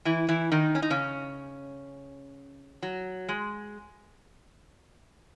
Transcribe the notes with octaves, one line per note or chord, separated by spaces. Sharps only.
E3 E4
E3 E4
D#3 D#4
C#4
D#4
C#3 C#4
F#3
G#3